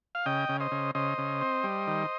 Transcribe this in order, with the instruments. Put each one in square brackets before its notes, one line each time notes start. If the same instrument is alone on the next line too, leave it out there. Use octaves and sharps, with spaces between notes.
[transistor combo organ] F5
C#3 D#5 G5
C#3
C5 D#5
C#3
C#3 C5 D#5
C#3
C4
G3
D#3